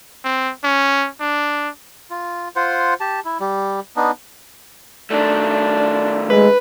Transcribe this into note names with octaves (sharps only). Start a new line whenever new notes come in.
C4
C#4
D4
F4
F4 C5 F#5
G4 A5
E4
G3
B3 D4 D#4
D#3 A3 D4
G#3 B4